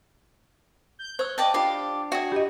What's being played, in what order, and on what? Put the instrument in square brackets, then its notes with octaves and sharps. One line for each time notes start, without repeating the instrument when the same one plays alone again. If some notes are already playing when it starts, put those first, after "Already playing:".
[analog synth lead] G6
[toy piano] C5 E6 [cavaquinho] C#5
[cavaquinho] D5 G5 A5 [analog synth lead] D#5
[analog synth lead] D4 [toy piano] F4 D6 [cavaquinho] G4 D5 F5
[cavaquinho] F#4 G#4 [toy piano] D5 E5 G5
[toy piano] F4 [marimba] G4 D#5